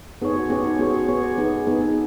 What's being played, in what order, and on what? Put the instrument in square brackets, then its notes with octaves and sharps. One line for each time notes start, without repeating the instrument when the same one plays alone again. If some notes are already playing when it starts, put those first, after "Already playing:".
[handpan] B3 G#4 C#5 [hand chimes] D#4
[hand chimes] F#4
[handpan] B3 G#4 C#5 [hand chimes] C#4
[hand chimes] D#4
[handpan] B3 G#4 C#5 [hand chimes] F#4
[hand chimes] F#4
[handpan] B3 G#4 C#5
[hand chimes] G#4
[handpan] B3 D#4 G#4
B3 D#4 G#4
[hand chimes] D#4